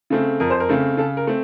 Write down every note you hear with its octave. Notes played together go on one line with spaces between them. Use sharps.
C#3 A3 C4
F2 A#4
C5
A#4
C#3 A3 C4
C#3 A4
A#4
A3 C4